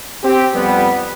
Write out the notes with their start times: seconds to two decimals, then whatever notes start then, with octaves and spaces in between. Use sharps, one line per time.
0.24 C4 G4
0.54 F2 G3 B3